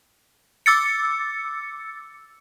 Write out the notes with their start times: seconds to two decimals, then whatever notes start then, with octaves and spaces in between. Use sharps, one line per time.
0.66 D6 E6 A6 C#7